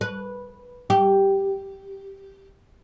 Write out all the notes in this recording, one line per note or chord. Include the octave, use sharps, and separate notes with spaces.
B4
G4